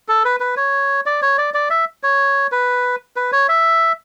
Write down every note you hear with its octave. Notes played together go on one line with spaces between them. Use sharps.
A4
B4
B4
C#5
D5
C#5
D5
D5
E5
C#5
B4
B4
C#5
E5